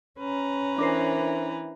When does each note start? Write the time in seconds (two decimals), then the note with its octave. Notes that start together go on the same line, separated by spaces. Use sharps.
0.20 C#4 B4 A#5
0.78 E3 D4 A#4 C5